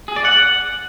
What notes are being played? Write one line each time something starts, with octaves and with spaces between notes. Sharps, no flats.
G#4
D5
F#5